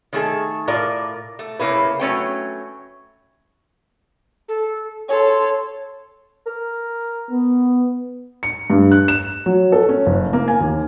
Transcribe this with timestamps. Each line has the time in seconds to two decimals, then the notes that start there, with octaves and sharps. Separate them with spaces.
0.13 D#3 A3 G#4 A4
0.68 A2 F4 A#4 D5
1.39 A3
1.59 C#3 A#3 E4 B4
2.00 F#3 A3 C#4 G5
4.48 A4
5.09 A4 C#5 C6
6.46 A#4
7.30 B3
8.43 C#7
8.70 G2
8.91 F#6
9.08 E7
9.46 F#3
9.72 A4
9.89 C#4
10.06 F#1
10.33 A#3
10.48 G#5
10.60 D#2